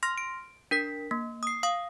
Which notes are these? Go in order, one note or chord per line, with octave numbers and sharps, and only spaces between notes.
C6 F6 A#6
D7
D4 A#4 B6
A#3
D#6 C7
F5 D#6